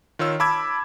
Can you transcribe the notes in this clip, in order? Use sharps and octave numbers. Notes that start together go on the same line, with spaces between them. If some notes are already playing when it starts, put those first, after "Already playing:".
D#3 F4 C#5 E6
A5 B5 D6 E6 G#6